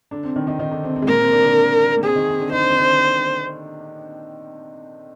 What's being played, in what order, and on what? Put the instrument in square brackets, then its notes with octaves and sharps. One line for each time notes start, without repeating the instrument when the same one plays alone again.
[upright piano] D3 D4
C3 C4
D#3 D#4
D#3 D#4
D#3 D#4
D3 D4
C3 C4
C3 C4
G#3
[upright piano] A#2 A#3 [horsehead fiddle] A#4
[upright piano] C3 C4
D3 D4
D3 D4
A#3
[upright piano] C3 C4 [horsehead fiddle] G#4
[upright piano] D#3 D#4
C4
D3 D4
[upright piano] D#4 [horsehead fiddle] C5
[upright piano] D4
C4
D3 D4